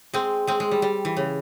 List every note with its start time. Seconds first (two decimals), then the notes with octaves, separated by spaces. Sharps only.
0.14 G#3 C4
0.47 G#3 C4
0.60 G#3
0.71 G3
0.82 G3
1.05 E3
1.17 C#3